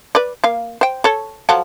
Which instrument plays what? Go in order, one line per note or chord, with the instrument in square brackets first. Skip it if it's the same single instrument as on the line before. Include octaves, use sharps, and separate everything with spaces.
[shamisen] B4 D5
A#3 F5
C5 G5
A4 C#5
F3 F#3 A4